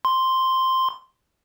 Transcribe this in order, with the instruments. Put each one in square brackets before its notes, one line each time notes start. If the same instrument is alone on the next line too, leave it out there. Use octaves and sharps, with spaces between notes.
[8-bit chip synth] C6